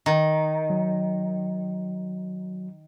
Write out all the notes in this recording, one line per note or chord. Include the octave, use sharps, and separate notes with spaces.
D#3
F#3